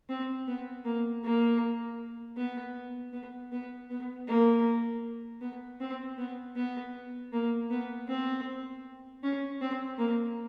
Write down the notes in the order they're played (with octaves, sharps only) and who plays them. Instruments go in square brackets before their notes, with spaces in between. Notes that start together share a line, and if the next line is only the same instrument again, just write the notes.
[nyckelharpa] C4
B3
A#3
A#3
B3
B3
B3
B3
A#3
B3
C4
B3
B3
A#3
B3
C4
C#4
C4
A#3